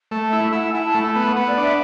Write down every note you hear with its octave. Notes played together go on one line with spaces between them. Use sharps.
A3
E5
E4
E4 F#5
G#5
E4
A5
A3
B5
B3 B5
F#5
B3
D5
D4 E5